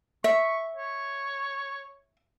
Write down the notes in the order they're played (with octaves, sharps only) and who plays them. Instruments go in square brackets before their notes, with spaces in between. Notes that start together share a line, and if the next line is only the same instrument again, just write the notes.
[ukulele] E5 [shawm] C#6
[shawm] C#5